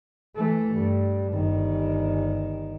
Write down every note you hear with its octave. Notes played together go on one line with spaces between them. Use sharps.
E3 A3
G2
G1 D#3